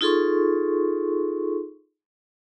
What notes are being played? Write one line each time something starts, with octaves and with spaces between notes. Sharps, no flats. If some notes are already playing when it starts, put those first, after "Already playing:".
D#4 F4 G#4 A4 C6 C#6